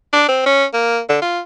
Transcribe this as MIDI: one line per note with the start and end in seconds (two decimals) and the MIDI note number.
0.13 0.27 62
0.28 0.43 60
0.46 0.65 61
0.73 1.00 58
1.09 1.20 50
1.22 1.40 65